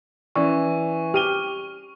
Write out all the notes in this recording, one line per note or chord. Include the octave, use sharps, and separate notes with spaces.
E3 C#4 D5 C#6
G4 F6 D#7 G7